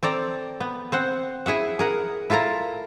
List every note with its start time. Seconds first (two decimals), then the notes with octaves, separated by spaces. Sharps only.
0.03 C4 A4 D5 A#5
0.60 B3
0.92 C4 C5 F#5
1.46 E4 G#4 E5 F#5
1.79 G#4 A#4 F#5
2.30 E4 F4 A4 A#4 A#5